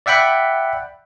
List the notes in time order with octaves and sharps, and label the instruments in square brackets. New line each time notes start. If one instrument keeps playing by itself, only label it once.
[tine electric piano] D5 E5 F#5 G5 B5 F#6